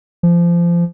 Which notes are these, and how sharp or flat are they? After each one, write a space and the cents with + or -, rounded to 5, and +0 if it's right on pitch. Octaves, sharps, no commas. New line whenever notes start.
F3 -25